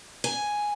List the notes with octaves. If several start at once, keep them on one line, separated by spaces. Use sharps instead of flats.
G#5